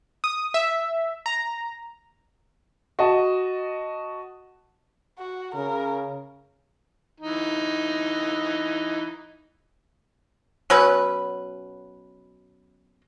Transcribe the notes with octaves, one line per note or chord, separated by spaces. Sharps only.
D#6
E5
A#5
F#4 D#5 A5
F#4
C#3 A#4
E3 D#4
B2 F#3 C#4 B4